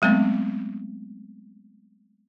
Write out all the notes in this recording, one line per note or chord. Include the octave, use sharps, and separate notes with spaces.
F#3 G#3 A3 B3 C4